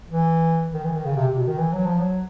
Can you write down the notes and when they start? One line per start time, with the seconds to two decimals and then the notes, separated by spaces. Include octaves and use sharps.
0.10 E3
0.74 D#3
0.84 E3
0.95 D#3
1.05 C#3
1.16 C3
1.27 C3
1.37 B2
1.47 D#3
1.58 E3
1.73 F#3
1.86 F3
2.00 F#3